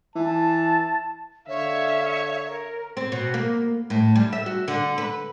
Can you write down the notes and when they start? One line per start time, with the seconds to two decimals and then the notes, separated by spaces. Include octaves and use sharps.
0.15 E3 A5
1.48 D3 C#5 E5 F5
2.47 A#4
2.97 C4
3.12 B2
3.34 A#3
3.90 A2
4.15 G3
4.33 E5
4.46 F#4
4.68 D3
4.98 B4